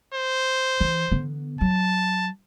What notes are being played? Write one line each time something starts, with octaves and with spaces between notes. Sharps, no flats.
C5
E3
D3 B3
F#3 A5